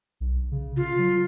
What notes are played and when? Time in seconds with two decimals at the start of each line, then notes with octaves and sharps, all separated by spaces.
0.20 B1
0.52 C#3
0.77 C#3 F4
0.98 F#3